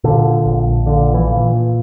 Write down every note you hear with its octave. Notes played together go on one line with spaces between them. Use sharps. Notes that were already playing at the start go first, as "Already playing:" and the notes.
A#2 D3
A#1
A#2 D3
E3
A#2